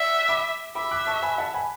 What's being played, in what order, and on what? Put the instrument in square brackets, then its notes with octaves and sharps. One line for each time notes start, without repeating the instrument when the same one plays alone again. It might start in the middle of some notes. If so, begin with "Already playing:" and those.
Already playing: [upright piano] D5 F#5 [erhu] E5
[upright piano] B5 D6
[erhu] E5 [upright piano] B5 D6
[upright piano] D6 F#6
A5 C#6
G#5 B5
F#5 A5
G#5 B5